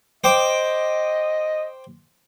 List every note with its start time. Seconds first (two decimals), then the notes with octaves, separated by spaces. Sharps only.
0.24 C5 D#5 G5 D6